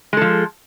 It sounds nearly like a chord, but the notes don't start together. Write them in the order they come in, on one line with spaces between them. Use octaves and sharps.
G#3 A4 F3